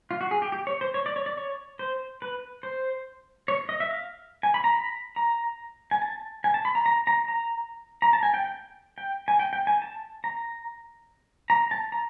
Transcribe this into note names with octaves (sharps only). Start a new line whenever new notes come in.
F4
F#4
G#4
G4
G4
C#5
C5
C#5
D5
C#5
D5
C#5
C5
B4
C5
C#5
D#5
E5
F5
G#5
B5
A#5
B5
A#5
G#5
A5
G#5
A5
B5
A#5
A#5
A#5
A#5
A#5
A5
G#5
G5
G5
G5
G#5
G5
G5
G#5
A5
A#5
A#5
A5
A#5